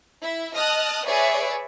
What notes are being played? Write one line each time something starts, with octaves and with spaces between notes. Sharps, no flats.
E4 E5
D#5 A5 D#6 F6 F#6
G#4 B4 C#5 D5 E5 G#5